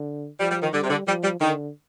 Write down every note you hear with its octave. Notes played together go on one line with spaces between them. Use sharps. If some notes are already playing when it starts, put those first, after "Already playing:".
Already playing: D3
F3 G3
G3
D#3
D3 G3
C3
D3
F3 G3
G3
D3 D#3